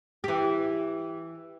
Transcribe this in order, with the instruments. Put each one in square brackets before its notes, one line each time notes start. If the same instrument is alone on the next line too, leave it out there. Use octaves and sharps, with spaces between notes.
[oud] E3 G4